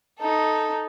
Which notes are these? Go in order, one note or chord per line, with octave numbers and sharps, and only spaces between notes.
D#4 A4